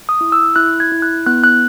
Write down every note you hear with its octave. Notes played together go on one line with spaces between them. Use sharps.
D#6
E4
E6
E4 F#6
G#6
E4
F#6
B3 F#6
F#6